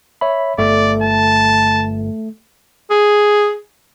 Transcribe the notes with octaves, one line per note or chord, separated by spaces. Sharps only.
C#5 E5 B5
G1 A3 D5
A5
G#4